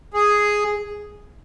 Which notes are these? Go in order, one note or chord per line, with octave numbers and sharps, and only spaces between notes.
G#4